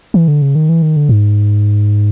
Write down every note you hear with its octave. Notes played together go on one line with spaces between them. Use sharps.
E3
D3
C#3
D#3
E3
D#3
D3
G#2